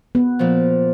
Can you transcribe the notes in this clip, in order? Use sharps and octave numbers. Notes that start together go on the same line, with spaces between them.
B3
A#2 F3